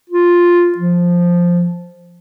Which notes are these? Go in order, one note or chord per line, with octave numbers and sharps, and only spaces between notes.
F4
F3